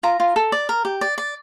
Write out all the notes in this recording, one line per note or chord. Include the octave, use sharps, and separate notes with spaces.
F4 A#5
F4
A4
D5
A#4
G4
D5
D5